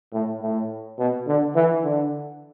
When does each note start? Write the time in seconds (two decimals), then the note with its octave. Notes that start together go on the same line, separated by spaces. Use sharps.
0.13 A2
0.42 A2
0.98 B2
1.27 D3
1.55 E3
1.84 D3